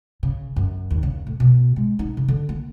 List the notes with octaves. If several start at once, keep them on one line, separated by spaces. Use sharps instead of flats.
C#3
F#2
D#2
C#3
A2
B2
G#3
D#4
C#3
D3
A#3